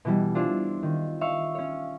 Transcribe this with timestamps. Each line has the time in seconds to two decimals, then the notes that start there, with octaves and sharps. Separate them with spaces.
0.05 B2 E3 G3
0.35 D4 E4 F4 C5
0.83 D#3
1.21 E5 F5 C#6
1.55 C#4 C#5